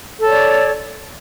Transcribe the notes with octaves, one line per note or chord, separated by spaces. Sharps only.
A4 C#5 D5